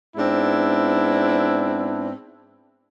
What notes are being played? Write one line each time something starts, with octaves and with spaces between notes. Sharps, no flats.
G#2 B3 C4 D4 E4